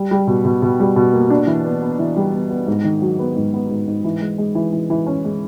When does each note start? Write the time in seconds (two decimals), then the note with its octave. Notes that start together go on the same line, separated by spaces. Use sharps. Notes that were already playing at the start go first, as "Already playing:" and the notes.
Already playing: G3
0.11 G3
0.27 B2
0.45 B2
0.62 B2
0.80 G3
0.96 B2
1.13 A#3
1.30 D4
1.47 E3
1.65 B3
1.82 B3
1.99 E3
2.16 G3
2.33 B3
2.50 B3
2.67 G#2
2.84 D#3
3.02 F#3
3.19 B3
3.36 G#2
3.54 B3
3.70 G#2
3.87 G#2
4.04 E3
4.21 G#3
4.38 G#3
4.55 E3
4.73 E3
4.90 E3
5.07 C#4
5.25 G#3